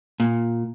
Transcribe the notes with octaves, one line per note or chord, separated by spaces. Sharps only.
A#2